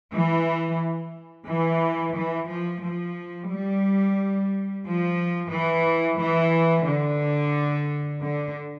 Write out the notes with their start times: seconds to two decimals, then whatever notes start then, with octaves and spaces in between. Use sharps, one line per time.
0.14 E3
1.48 E3
2.16 E3
2.49 F3
2.83 F3
3.50 G3
4.85 F3
5.53 E3
6.20 E3
6.88 D3
8.22 D3